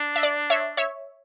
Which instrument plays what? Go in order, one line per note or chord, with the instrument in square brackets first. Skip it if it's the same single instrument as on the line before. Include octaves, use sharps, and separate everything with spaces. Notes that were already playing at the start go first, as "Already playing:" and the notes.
Already playing: [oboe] D4
[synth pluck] E5
D5
C#5 E5
C#5 E5